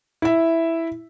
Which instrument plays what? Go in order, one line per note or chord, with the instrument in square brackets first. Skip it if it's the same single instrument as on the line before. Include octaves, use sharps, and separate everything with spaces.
[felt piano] E4 E5